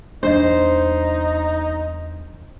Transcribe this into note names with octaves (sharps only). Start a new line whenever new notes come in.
E2 G3 A#3 D4 D#4 C5 D#5